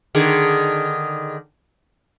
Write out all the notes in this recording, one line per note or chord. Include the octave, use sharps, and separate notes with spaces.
D3 D#3 G#4